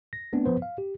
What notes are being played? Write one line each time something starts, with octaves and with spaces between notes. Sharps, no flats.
A#6
A3 B3 C4 D4
F3 B3 B4 C5
F5
G4